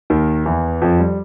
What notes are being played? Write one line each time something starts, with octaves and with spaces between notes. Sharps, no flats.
D#2 D#3
E2 E3
F2 F3
G3